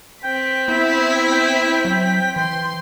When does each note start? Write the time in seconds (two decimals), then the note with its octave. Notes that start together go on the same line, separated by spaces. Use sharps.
0.24 C4 G5 B6
0.68 B3 E4
1.32 G5
1.85 F#3
2.36 E3 C6